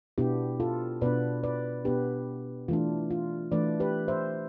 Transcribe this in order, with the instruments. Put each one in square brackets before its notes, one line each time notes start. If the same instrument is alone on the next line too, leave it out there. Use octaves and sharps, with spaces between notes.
[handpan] B2 B3 D4 E4 G4
F4 A4
B2 B3 D4 B4 D5
B4 D5
B2 B3 D4 G4 B4
E3 A3 D4 F4
F4
E3 A3 D4 B4 D5
G4 B4
C5 E5